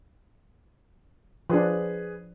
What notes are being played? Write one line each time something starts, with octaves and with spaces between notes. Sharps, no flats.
F3 D4 G#4 B4